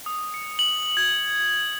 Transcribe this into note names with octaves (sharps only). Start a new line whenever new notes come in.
D#6
C#7
F#7
G#6